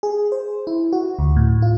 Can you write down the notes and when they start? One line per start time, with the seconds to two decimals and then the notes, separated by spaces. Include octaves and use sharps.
0.03 G#4
0.32 C5
0.67 E4
0.93 F#4
1.19 D2
1.36 A2
1.62 F4